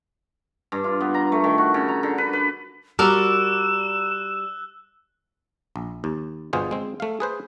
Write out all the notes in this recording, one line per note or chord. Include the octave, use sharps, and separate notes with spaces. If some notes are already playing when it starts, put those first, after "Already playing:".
G2
F4
B3
A#5
A3
D#3
F#4
C#3
A#5
D3
B4
B4
G3 F#4 A#4 D5 E6 F#6 E7
A#1
D#2
G1 B2 F4 G#4 C5
G#3 C4
A3 F5
G#4 B4 C5